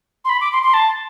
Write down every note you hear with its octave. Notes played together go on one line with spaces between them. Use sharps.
C6
B5
D6
C6
C6
A5